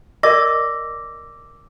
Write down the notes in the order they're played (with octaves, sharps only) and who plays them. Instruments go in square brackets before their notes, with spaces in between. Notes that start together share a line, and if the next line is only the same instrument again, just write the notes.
[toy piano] A#4 D5 D#5 [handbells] D6 E6 A#6